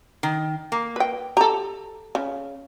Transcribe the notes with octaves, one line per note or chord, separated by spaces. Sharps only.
D#3
A#3
B4 G5
G4 A4 A#5
C#3